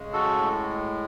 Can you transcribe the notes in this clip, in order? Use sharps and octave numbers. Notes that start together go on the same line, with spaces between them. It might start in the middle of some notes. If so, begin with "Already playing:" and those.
Already playing: C#3 G#3
F#4 A4
A2 G#3